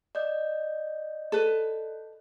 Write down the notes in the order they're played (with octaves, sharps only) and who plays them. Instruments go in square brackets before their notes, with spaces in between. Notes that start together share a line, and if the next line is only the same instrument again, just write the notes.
[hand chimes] D5 D#5 G6
[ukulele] A4 B4